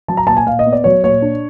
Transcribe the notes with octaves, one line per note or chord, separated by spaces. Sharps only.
F#3 A5
A#5
A#2 A5
G#5
A#2 F5
D#5
B3
D5
F#3 C#5
A#2 C#5
D4